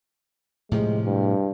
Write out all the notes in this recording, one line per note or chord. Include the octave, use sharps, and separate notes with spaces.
A2 C3 F3 G#3
G2